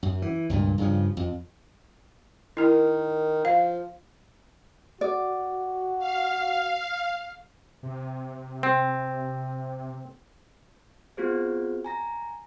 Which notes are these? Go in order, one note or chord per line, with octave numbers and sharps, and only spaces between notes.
F#2
E3
C#2 G2 A#2
G2 C#3 F3
F2
D#3 E4 A#4
F3 F5
F#4 D5
F5
C3
C4
B3 C4 F4 F#4 G#4 C5
G#5 A#5 A#6